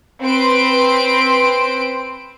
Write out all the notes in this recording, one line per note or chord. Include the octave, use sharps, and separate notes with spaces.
C4 B4 C6 D7